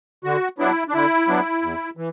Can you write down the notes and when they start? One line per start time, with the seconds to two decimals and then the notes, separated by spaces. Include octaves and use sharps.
0.24 D3 F#4
0.59 F#3 B3 D4 E4
0.89 D4
0.94 D3 E4
1.28 F#3 B3 D4
1.62 E2
1.97 E3